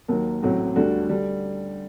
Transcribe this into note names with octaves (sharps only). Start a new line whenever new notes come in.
D#2 D#3 F#3 A#3
A1 A2 F#3 C4 F#4
D2 D3 G3 D4 F#4
D3 G3